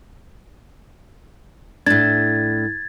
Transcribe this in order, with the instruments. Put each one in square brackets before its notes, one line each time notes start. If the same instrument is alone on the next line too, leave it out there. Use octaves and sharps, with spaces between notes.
[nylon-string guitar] A2 D4 [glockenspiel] G#6 A6